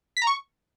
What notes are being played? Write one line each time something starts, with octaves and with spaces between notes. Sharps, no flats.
B6
A#5
C#6